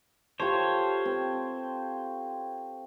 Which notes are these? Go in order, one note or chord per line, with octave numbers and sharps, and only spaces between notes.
F4 G4 A4 C5 C#5
C4